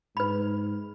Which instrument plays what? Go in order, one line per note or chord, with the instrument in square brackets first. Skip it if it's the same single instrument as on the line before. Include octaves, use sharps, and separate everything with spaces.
[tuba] G#2 [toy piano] B4 B5